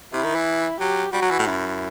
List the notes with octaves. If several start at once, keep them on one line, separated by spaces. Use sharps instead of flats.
C3 E4
D#3
E3
F#3 G4
G3 F#4
F#3
E3
A2
F#2 E4